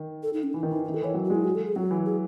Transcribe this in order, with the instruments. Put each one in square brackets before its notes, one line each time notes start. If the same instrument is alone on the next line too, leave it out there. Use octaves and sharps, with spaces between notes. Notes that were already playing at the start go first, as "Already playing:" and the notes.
Already playing: [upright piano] D#3
[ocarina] A4
D#4
C#4
[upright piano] E3 [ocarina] D#4
[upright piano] D#3
[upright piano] E3 [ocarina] D#4
[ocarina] E4
[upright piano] D#3
[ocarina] A4
[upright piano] E3 [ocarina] C#5
[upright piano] F#3
[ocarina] F#4
[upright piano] G#3 [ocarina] E4
[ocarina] F#4
A4
G#4
[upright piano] F#3 [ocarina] F#4
[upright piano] E3
[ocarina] G#4